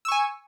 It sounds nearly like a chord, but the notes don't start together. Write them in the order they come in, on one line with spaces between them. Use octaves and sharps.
E6 C#6 G#5